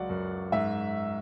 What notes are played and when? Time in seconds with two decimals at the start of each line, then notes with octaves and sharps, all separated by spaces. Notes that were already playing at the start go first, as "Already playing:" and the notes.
Already playing: C#2 F#3 D5 F#5
0.09 F#2
0.52 G#2 E5